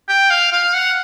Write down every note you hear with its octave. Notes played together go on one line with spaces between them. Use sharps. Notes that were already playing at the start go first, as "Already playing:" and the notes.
G5
F5
F5
F#5